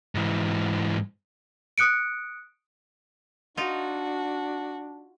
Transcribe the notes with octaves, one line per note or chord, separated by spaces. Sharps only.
G#2 E3
D#6 F#6 C#7 D7
D4 D#4 F4 F#4